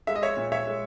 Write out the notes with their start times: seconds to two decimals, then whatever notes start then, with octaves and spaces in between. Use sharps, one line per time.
0.07 G#3 E5
0.16 D#5
0.22 C#5 E5
0.37 A#2
0.52 C#5 E5
0.67 G#3